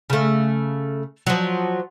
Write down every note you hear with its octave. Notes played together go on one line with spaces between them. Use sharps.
C#3 A3
F3 F#3